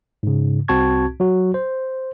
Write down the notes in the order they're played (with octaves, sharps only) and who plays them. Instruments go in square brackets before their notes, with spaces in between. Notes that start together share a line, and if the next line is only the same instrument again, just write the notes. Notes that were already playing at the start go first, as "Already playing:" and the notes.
[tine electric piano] G#2 C#3
C2 C4 F#4 A5 C#6 G#6
F#3 F#4
C5